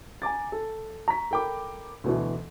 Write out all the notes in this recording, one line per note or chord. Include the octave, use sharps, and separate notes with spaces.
G#5 A#5 D6 A6
A4
A#5 C#6 B6
A4 A#4 G5 B5 D6
D2 B2 E3